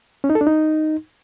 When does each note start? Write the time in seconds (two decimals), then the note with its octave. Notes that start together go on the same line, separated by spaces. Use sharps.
0.24 C#4
0.30 D#4
0.35 A4
0.41 D4
0.47 D#4